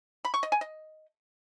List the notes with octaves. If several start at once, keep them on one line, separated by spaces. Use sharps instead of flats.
B5
C#6
D#5
G#5
D#5